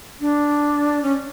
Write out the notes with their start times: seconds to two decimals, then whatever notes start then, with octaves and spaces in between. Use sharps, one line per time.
0.21 D4
1.03 C#4